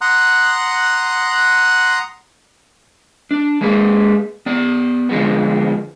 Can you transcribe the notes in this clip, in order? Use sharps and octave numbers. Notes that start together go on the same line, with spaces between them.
F#5 A#5 C6 D#6 F#6
D4
G#3 A#3 G#4 B4
B3 D5
D3 F3 G#3 B3